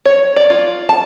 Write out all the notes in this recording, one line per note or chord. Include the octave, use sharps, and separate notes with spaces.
C#5
D5
F4
A5